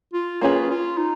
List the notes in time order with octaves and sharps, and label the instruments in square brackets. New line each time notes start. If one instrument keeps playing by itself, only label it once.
[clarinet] F4
[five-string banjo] A#3 C#4 G#4 B4 [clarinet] F4
[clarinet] F4
D#4